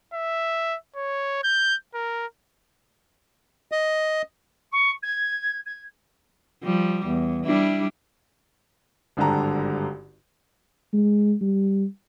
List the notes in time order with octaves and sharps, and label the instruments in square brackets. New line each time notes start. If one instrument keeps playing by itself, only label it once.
[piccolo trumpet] E5
C#5
G6
A#4
[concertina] D#5
[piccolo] C#6
G#6
G#6
[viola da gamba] F3 G3
E2
G3 D4 E4
[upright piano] G#1 G2 D3 G3 A5 A#5
[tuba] G#3
G3